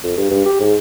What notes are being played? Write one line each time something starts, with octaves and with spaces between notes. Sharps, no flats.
F2
G2
G2
G4
G#2